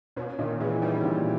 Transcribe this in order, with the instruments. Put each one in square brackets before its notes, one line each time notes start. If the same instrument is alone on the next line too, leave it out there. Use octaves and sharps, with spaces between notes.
[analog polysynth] B2 [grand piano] C#4
[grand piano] A#2 [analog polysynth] D#3
[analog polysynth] E3 [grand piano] G#3
[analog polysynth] G3 [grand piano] C#4
[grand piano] A#2